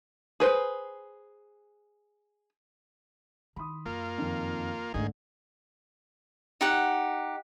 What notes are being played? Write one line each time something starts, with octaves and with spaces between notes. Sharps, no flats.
G#4 B4 C5
D#3 B5 C6 D#6
F#2 A#3 F4
F2 D#3
D2 G#2 D3 D#3 A3 G#4
D#4 G4 F#5